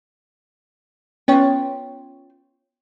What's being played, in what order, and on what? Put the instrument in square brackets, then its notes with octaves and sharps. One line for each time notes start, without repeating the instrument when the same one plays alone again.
[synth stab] B3 C#4 C#5 [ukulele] F4 G5